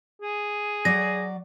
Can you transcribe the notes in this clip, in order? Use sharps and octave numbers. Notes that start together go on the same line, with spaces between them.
G#4
F#3 D5 A#6